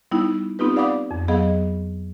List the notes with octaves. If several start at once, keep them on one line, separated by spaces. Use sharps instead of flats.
G3 B3 D#4 E4
B3 C4 D#4 F4 G4 B4
D5 F5 F#5 B5 D6 D#6
F2
F#3 B3 G#4 D#5 F5